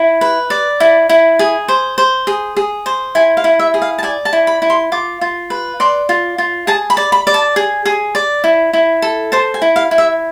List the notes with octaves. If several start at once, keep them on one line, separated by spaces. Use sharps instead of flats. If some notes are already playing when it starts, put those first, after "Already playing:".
Already playing: E4
B4
D5
E4
E4
G#4
C5
C5
G#4
G#4
C5
E4 G#5
F5
E4
E5
G#4
F5
A5
D5 G#5
A5
E4
B5
E4
C6
F4 D6
F4
B4
D5 C6
F4
F4
G#4 A5
B5
D5
B5
D5
A5
G#4
G#4
D5
E4
E4
A4
C5 A5
G#5
E4
F5
E4
E5